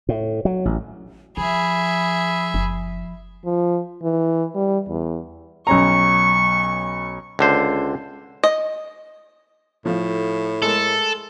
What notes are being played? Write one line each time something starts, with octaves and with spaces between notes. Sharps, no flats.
A2
F#3
A1
F3 G#4 E5 B5
F#1
F3
E3
G3
E2
B1 C#4 A#5 C#6
C#2 D3 C5
D#5
A2 F3 A3
G#3 A3 A4 A#4